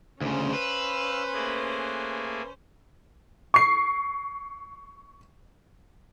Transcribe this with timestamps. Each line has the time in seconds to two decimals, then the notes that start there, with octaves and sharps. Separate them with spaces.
0.21 D2 C#3 C#4 C5
0.53 B4 F5 E6
1.33 A3 A#3 G#4
3.54 C#6 C7